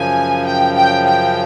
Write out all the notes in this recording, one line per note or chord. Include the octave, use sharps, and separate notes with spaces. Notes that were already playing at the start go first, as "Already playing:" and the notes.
Already playing: F#2 C#3 F3 G#5
G5
G5
G5